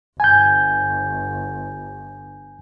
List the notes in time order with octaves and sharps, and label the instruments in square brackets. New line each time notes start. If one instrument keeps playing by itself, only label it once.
[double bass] G1 [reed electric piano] G#5 G6